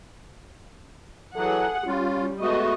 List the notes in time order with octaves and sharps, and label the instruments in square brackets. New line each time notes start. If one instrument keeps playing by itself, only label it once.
[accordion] E3 F#3 [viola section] G#4 F#5 [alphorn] A4
[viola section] G3 [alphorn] C#4 [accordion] F4
[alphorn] G#3 [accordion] A3 B3 F#4 [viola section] D#5